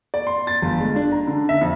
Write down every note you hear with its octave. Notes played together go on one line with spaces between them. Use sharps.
D5
C6
A6
G1
G#3
D4
A#5
D3
E5
F2